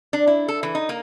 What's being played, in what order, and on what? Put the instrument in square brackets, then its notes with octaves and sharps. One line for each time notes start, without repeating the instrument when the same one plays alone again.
[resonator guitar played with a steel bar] D4
E4
A4
E3
D#4
A#3